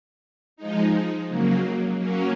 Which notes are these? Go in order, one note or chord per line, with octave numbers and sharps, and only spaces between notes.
F3 G#3 D#4
C#3 F#3 A#3
F#3 A#3 C#4